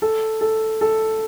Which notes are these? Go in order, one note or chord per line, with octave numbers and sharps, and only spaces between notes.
A4
A4
A4